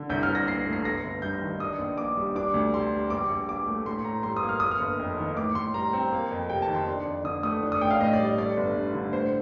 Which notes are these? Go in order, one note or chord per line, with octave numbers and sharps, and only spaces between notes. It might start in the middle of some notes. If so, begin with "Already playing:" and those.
Already playing: D3
C2 G6
F6
C2
A#6
A#2 C7
A3
C7
G1 A#6
G1
G2 G6
D#3
D4 D#6
A#1
A#2 D6
G3
D4 D6
D2
C3 C6
G3
A#1 D6
A#1
A#2 D6
A3
A2 C6
A2 A#5
G3 C6
D#6
A#3
F6
A#3 D#6
F6
G1
F2
D#3
A2 D6
A2 C6
G3 A#5
C4
A#3
F2
C3 G5
A5
D#3
C6
D4
F2
D3 D#6
A3 D#6
D4
D#6
A1 G5
F5
A2 D#5
D5
G3
D5
A3 D5
G1
G2
D3
A2 C5